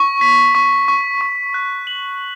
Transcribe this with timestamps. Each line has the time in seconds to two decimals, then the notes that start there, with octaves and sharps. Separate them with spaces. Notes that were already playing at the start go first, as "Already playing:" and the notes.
Already playing: C#6
0.21 B6
0.55 C#6
0.88 C#6
1.21 C#6
1.54 F#6
1.87 F#7